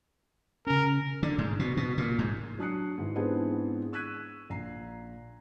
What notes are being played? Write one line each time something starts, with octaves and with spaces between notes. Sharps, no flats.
C#3 C#4 A#4
D3
G#2
B2
B2
A#2
G#2
F#3 D4 D#6 F#6 C7 C#7
G#2 E3
G#2 B3 C4 D4 E4 G#4
C#6 E6 F#6 G#6 B6 D#7
A#1 A#5 C7